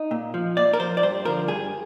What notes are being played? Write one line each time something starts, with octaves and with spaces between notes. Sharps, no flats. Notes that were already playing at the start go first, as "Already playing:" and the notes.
Already playing: D#4
A#2
F3
A#2 D5
A#4
F3 C5
D5
G2 C5
D3 F3 A#4
G2 G#4